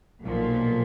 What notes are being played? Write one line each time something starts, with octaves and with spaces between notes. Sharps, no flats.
B1 A#2 F3